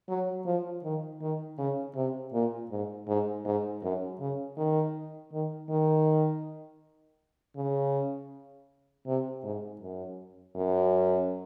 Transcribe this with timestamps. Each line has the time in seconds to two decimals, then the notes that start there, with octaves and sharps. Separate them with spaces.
0.09 F#3
0.46 F3
0.84 D#3
1.21 D#3
1.58 C#3
1.96 C3
2.33 A#2
2.71 G#2
3.08 G#2
3.45 G#2
3.83 F#2
4.20 C#3
4.57 D#3
5.32 D#3
5.70 D#3
7.56 C#3
9.06 C3
9.44 G#2
9.81 F#2
10.56 F#2